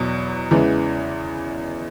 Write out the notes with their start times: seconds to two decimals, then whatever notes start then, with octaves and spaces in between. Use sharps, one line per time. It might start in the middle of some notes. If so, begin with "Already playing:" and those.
Already playing: E2 B2 F#3
0.51 E2 C#3 E3 G#3 B3